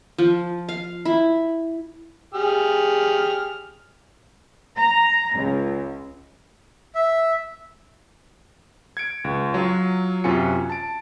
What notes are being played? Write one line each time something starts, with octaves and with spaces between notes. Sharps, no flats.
F3
F5
E4
G4 G#4 F6
A#5
C#2
E5
G#6 C#7 D7
C#2
F#3 F4
F#2 C3 F4 F#4 G#5 C#7
A5 D7